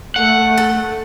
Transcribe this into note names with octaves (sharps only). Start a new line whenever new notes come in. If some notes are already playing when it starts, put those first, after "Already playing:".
A3 F#5
A4